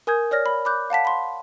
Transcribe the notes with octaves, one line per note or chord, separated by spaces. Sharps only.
A#4 G#5 D#6 G6 G#6
C#5 D5 F6 A#6
B5
B5 D6 F#6 G6
F5 F#5 A5 B6
B5 C6